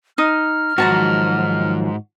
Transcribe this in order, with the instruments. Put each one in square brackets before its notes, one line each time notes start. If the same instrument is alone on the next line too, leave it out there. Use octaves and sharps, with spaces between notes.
[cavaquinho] D#4 D#6 [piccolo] F6
[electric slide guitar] G#2 [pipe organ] D#3 F3 F#3 [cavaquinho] F#4 A5 A#5